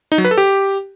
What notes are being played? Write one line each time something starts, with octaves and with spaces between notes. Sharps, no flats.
D#4
F#3
B4
A4
G4